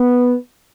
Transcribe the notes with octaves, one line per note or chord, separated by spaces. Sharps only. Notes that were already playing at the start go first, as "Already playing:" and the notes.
Already playing: B3